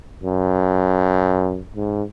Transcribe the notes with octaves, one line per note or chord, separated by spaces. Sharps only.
F#2
G#2